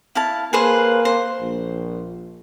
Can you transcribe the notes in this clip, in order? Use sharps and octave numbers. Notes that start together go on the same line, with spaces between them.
E4 F5 A5
A#3 G#4 B4 C5
C5
A#1